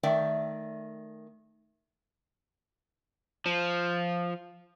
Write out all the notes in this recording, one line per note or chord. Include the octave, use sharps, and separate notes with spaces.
D#3 A3 D5 E5 G5
F3